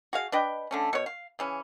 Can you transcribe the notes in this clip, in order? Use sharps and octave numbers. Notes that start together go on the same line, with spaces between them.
F#4 G#4 F5
D4 B4 D#5 G5
D3 A3 C#4
B2 C#5
F5
C#3 E3 C#4